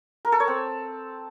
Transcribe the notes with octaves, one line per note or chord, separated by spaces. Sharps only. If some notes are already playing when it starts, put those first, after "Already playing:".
A#4
A4
C#5
C4